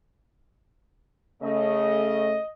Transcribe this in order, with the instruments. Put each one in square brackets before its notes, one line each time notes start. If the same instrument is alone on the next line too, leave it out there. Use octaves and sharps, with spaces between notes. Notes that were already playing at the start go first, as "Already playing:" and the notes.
[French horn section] C#3 A3 [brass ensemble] D#5